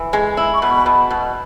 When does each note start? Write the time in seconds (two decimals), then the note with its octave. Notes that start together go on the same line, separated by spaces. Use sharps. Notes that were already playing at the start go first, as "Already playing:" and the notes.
Already playing: E3
0.13 G#3
0.37 E4
0.54 C#6
0.62 B2 B5
0.86 B2
1.11 B2